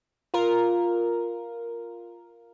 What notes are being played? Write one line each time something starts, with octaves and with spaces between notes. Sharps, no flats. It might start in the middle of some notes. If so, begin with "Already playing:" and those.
F4 A#4